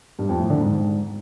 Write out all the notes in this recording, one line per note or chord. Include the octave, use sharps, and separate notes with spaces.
G2
F2
A2
D3
G#2